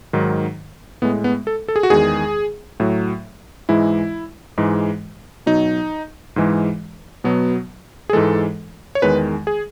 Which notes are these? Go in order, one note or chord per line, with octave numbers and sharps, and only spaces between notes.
G#2 D#3 F#3
A2 G#3 B3
B3
A4
A4
G#4
F#4
E2 D#3 G#3 G#4
A2 F#3
G#2 E3 G#3 E4
G#2 E3 G#3
B2 F#3 D#4
G#2 E3 G#3
B2 F#3 B3
G#4
G#2 E3 G#3 A4
C#5
E2 D#3 G#3 B4
G#4